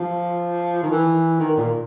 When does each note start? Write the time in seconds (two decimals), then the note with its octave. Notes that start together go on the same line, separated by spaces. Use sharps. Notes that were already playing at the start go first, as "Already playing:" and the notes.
Already playing: F3
0.83 D#3
0.91 E3
1.40 D#3
1.57 A#2